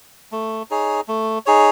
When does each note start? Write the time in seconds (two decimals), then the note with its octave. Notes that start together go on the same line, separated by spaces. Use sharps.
0.32 A3
0.70 D#4 G#4 C#5
1.08 A3
1.46 D#4 G#4 C#5